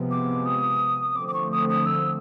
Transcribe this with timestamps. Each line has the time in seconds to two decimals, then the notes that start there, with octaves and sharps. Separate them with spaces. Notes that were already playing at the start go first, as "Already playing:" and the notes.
Already playing: C3 F3 G#3 B3
0.11 D6
0.46 D#6
1.16 D3 F3 A3 C4 D6
1.28 D6
1.34 C#6
1.51 D#6
1.69 D#6
1.86 E6